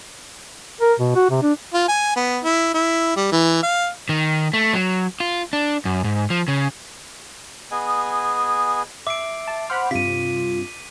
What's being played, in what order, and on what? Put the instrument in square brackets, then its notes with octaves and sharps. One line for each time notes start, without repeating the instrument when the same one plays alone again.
[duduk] A#4
B2
F#4
C3
D4
[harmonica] F4
G#5
B3
E4
E4
G3
E3
F5
[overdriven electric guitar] D#3
A3
F#3
F4
D4
F#2
G#2
F3
C#3
[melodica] B3 G#4 D#5 G#5
[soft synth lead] E5 [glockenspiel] D6 C7 D7
[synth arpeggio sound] A5
[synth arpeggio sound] C5 F#5 B5 [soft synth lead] F6
[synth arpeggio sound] G2 C3 [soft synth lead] F4 [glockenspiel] B6 D#7